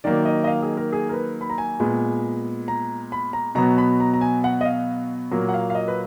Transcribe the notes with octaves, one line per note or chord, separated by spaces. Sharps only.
D#3 F#3 A#3 D5
D#5
D#5
F5
G#4
A#4
G#4
A#4
B4
B5
A#5
G#5
A#2 G#3 B3
A#5
B5
A#5
B2 F#3 B3 A#5
B5
A#5
A#5
G#5
F#5
D#5
F5
A#2 F#3 A#3
F#5
F5
F5
D#5
B4